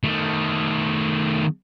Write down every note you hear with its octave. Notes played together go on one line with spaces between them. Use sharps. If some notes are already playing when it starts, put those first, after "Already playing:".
D#3 A3